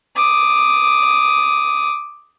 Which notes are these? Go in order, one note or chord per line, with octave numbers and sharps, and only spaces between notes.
D6 D#6